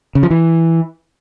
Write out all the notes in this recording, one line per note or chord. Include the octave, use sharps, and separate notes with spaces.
C#3
F3
E3